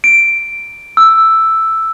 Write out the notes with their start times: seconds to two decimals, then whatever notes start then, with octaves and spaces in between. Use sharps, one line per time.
0.04 D7
0.97 E6